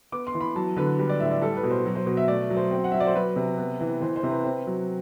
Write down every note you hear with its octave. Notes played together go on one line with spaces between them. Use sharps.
B3 D6
C6
E3
B5
F#3 A5
D3 B4
G3 B4
D5
A2 E5
D5
G3 A4
B4
B2
C5
F#3
C5
B2
E5
A3 D5
F#3
C5
C4
F#5
F#3 E5
D5
C5
F#3 B4
C3
B3
E3
E3 C5
C5
C3
B4
C4
F#3